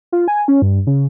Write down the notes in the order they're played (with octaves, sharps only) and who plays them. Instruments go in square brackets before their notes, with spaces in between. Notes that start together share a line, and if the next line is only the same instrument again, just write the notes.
[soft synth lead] F4
G#5
C#4
G2
C#3